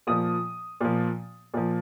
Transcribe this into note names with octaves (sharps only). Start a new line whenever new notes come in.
A#2 F3 D#6
A#2 F3
A#2 F3